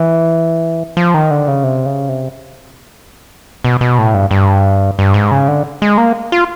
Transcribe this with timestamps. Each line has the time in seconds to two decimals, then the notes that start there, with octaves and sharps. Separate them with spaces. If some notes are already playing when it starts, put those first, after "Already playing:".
Already playing: E3
0.97 F3
1.14 D#3
1.31 D3
1.48 C#3
1.64 C3
1.86 C#3
2.09 C3
3.64 B2
3.81 B2
3.98 A2
4.14 G2
4.31 G2
4.99 G2
5.14 G#2
5.31 C#3
5.48 D3
5.82 G#3
5.98 A#3
6.32 F4